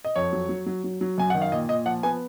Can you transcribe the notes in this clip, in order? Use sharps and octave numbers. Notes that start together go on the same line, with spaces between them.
D#5
F2 C#5
F#3
F#3
F#3
F#3
F#3
F#2 G#5
D#3 F#5
F5
A#2 D#5
A#2 D#5
F3 F#5
B3 G#5